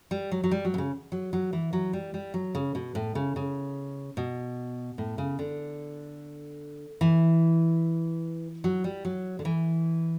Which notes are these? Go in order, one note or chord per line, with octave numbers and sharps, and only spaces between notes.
G3
F#3
F#3
G3
F#3
B2
C#3
F#3
F#3
E3
F#3
G3
G3
F#3
C#3
B2
A2
C#3
C#3
B2
A2
C#3
D3
E3
F#3
G3
F#3
D3
E3